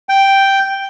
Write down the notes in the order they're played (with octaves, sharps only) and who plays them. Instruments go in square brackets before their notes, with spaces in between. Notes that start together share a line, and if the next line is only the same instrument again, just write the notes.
[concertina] G5